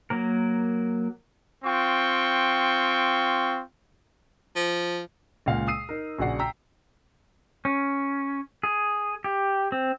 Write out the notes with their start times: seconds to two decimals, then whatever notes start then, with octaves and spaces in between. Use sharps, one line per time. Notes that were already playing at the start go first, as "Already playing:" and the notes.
0.10 F#3 A#3 A#4
1.65 C4 F4 G5 C#6
4.56 F3
5.46 C#2 A#2 F5 F#5
5.68 D#6 E6 C7 D#7
5.89 D#4 A#4
6.18 A#1 C#3 F#4 D5 F#5 C7
6.39 G5 A#5 E6 B6
7.65 C#4
8.63 G#4
9.24 G4
9.72 C4